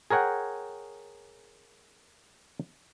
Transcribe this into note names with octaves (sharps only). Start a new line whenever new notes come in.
G#4 A#4 C#5 F#5 G5